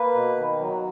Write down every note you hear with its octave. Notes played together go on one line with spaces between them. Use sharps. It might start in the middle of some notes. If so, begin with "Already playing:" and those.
Already playing: A#3 B4
B2
D#3
F#3